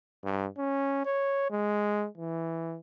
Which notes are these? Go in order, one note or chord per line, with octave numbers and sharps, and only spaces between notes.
G2
C#4
C#5
G#3
E3